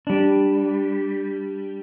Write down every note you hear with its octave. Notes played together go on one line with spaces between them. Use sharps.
G3 D4